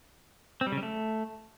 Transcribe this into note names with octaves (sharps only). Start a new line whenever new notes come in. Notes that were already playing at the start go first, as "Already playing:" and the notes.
C4
G3
C#3
G3
A3